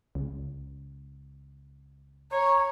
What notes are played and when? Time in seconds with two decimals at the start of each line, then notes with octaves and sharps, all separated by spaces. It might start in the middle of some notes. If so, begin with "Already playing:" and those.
0.15 C#2
2.32 C#5 A#5